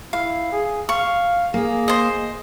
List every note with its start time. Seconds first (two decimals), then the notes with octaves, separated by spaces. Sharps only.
0.13 E4 F5
0.52 G#4
0.89 F5 C#6
1.54 A#3 G#4
1.88 C5 D#5